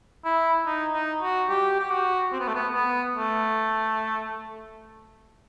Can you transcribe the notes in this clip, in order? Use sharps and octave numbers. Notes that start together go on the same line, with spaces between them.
E4
D#4
D#4
F#4
G4
G4
F#4
C4
B3
A3
B3
B3
A3